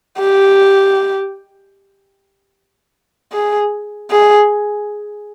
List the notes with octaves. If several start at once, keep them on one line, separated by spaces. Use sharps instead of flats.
G4
G#4
G#4